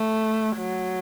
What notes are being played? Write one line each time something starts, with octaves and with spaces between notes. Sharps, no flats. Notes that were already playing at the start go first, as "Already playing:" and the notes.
Already playing: A3
F#3